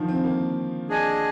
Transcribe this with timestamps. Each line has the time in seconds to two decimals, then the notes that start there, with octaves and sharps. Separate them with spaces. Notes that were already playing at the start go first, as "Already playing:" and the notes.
Already playing: D3 D#3 F3
0.09 C4
0.24 A#3
0.89 D4 G#4 D#5 G#5